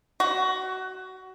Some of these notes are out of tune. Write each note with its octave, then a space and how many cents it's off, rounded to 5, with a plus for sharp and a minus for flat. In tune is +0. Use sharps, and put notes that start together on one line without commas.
F#4 +20